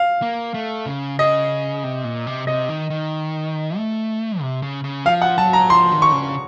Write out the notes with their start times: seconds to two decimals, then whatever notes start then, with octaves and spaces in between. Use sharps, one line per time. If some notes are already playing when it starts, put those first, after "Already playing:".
Already playing: F5
0.22 A#3
0.54 A3
0.86 C#3
1.19 C#3 D#5
1.84 C3
2.04 A#2
2.27 C3
2.47 C3 D#5
2.69 D#3
2.90 D#3
3.77 A3
4.41 C3
4.62 C#3
4.84 C#3
5.05 F3 F5
5.22 F#5
5.38 F#3 A5
5.53 A#5
5.69 F3 C6
5.92 D#3
6.02 C#6
6.12 C#3